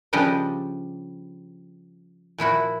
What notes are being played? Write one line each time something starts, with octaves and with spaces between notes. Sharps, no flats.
C#3 F3 G3 D4 G4 D#5
A#2 F3 E4 F#4